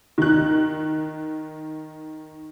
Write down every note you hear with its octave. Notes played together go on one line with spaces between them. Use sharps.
D#3 F#6